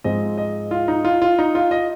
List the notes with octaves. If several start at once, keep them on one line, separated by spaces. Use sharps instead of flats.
G#2 F3 G#3 C4 D#5
D#5
F4
D#4
F4
F4
D#4
F4
D#5